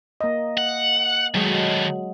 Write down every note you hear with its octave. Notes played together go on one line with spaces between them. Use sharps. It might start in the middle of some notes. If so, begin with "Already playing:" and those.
A#3 D#5
F#5
D#3 F#3 G#3 A3